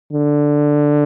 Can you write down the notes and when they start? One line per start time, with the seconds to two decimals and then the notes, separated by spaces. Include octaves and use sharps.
0.13 D3